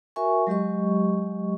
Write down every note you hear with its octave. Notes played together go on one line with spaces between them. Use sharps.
F#4 A#4 E5 G#5 C#6
F#3 G#3 G4 D#5 C#6